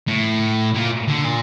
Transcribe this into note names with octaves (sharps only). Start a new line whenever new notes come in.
A2
A#2
D3
A#2